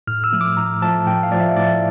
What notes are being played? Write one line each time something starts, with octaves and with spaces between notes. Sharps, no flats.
A2 F6
E6
F3 A3
D6
A2 A#5
F3 A3 A5
A2 G5
F5
F3 A3 D5
E5
A2 D5